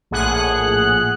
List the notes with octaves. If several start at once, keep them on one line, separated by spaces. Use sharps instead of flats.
A#1 A2 G#4 F#5 F#6